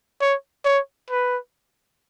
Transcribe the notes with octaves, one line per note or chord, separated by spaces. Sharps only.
C#5
C#5
B4